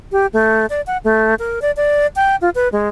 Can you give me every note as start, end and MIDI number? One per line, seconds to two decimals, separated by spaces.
0.12 0.27 67
0.33 0.66 57
0.70 0.81 74
0.87 0.98 78
1.04 1.35 57
1.39 1.60 70
1.62 1.71 74
1.77 2.07 74
2.16 2.36 79
2.41 2.50 65
2.55 2.68 71
2.72 2.89 56